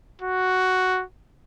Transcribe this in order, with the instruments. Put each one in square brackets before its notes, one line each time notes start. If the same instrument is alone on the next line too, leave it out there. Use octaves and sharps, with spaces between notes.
[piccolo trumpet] F#4